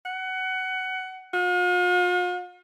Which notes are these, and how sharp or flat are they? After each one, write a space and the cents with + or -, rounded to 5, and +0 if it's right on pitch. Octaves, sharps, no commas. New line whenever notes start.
F#5 +20
F4 +45